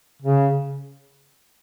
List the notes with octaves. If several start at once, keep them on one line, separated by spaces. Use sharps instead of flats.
C#3